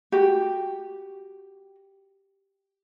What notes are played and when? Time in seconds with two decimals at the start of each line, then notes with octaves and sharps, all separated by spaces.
0.12 F#4 G4